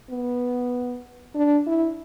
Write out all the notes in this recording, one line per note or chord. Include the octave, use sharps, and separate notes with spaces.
B3
D4
E4